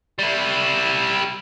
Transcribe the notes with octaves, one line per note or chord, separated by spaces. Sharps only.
G3 E4